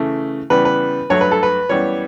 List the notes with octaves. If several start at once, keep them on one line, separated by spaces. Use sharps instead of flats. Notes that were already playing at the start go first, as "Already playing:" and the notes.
Already playing: C#3 E3 A3
C#3 E3 G3 B3 B4
B4
G2 F#3 A3 C#5
B4
A4
B4
F#2 E3 G3 B3 C#5